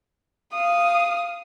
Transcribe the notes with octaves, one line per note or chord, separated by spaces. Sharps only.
F5 D#6